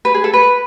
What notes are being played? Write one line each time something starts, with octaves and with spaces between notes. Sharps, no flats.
B4
G#4
A4
B4